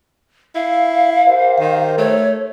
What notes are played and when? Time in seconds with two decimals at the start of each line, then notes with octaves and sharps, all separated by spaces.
0.55 E4 F5
1.27 G4 A#4 C5
1.60 D#3
1.98 A3 C#5